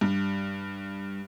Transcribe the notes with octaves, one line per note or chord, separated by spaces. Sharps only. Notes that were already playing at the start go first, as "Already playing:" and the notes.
G2